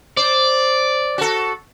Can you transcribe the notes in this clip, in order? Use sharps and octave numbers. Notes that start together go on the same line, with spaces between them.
C5 D5
F#4 A4